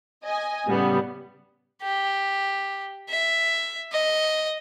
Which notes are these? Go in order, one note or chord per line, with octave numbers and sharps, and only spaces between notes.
D#5 G#5
A2 C#3 G3 B3
G4
E5
D#5